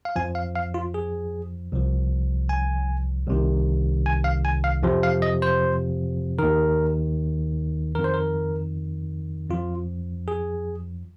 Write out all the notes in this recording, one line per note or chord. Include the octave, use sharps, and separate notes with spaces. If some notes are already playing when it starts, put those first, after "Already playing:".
F5
F2 F3 G#5
F5
F5
F4
G#4
C2 C3 F3
G#5
C2 C3 D#3
G#5
F5
G#5
F5
F2 C3 F3
F5
D#5
C5
D#2 D#3 A#4
F2 D#3 A#4
C5
A#4
F2 F3 F4
G#4